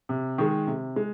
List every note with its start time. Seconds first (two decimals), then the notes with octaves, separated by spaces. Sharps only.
0.09 C3
0.38 D#3 G#3
0.67 C3
0.96 G#3